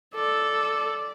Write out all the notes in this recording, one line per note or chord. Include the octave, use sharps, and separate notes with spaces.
A4 D5